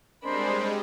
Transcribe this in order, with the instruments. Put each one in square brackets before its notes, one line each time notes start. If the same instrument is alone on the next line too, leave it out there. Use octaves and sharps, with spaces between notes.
[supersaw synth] G3 G#3 [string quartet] C4 D4 B5 [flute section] A#4 C5